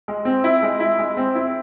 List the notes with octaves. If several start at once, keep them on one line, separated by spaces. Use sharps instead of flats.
G#3
C4
E4
G#3
E4
G#3
C4
E4